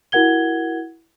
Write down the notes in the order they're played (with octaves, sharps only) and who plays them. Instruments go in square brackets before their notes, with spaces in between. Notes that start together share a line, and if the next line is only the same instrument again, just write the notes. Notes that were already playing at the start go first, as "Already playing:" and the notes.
[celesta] E4 F#4 A#4 F#5 G#6 G7